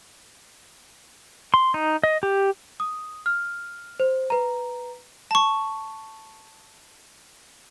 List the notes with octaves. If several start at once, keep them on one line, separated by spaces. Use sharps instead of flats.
C6
D#4
D#5
G4
D#6
F6
C5
B4 A#5
A5 C#6